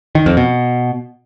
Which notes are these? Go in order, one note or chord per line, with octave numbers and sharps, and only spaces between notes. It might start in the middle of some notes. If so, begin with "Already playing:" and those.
D#3
F2
B2